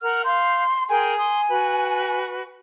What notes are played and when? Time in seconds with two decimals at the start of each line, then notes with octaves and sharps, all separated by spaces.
0.02 A#4 F#5 F6
0.24 F5 C6 G6
0.89 G#4 A#4 G5 G#5
1.18 C6 D#6
1.48 F#4 B4